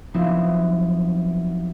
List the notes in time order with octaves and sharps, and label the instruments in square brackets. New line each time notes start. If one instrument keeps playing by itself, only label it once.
[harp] F3 F#3 B3 C4 D#4 E4